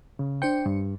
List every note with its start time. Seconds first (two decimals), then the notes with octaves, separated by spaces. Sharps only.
0.19 C#3
0.42 D4 C5 G5 C#7
0.66 G2